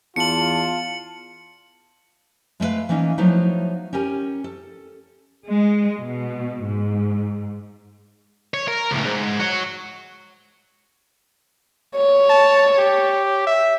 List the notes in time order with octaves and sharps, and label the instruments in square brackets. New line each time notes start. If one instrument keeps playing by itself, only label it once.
[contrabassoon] E2 [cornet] F4 [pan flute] A5 [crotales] C#7 F#7
[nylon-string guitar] G#3 A3 B3 B4 F5
E3 A#3 C#4 D#4
F3 F#3 A3 B3 D#4 E4
C#4 G4 A#4 G#5
A4
[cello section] G#3
B2
G#2
[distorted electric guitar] C#5
A#4
C#2 A2
G#2
F#4 C#5
[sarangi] C#5
[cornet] A5
G4
E5